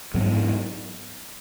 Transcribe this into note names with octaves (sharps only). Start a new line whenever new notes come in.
G#2 F#3 B3